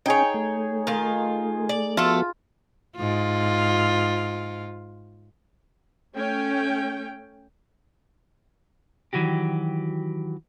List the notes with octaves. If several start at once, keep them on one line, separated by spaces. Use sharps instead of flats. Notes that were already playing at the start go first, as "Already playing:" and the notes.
C#4 D#4 G#4 C#5 G5
A3
D#3 F4
D5
F3 A3 B3 F4 F#4 A4
G#2 F4
A3 C#4 G5
D#3 E3 F#3 F#4 G4